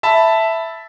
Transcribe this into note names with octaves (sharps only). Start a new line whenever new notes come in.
E5 A5 B5